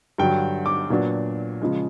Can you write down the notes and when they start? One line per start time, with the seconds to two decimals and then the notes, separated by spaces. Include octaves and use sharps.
0.18 G2 D3 F#3 G5
0.66 D6
0.90 A#2 F#3 B3 D4
1.61 C#3 F3 G#3